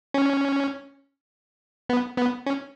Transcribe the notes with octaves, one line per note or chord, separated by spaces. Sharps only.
C#4
B3
B3
C#4